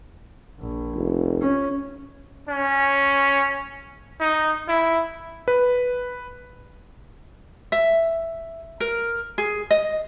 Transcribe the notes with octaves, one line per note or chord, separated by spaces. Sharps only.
A#1
F1
C#4
C#4
D#4
E4
B4
E5
A#4
G#4
D#5